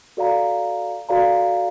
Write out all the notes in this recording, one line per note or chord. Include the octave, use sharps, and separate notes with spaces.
F#4 A4 D5 F5 A#5
F#4 A4 D5 F5 A#5